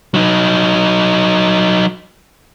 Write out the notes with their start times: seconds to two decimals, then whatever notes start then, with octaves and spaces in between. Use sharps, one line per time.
0.14 F#3 D#4